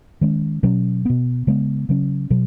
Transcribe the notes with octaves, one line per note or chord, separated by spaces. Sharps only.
D#3 G#3 C#4
B2 F#3 C#4
B2 B3
C#3 G#3 B3
C#3 F#3 C#4
B2 F#3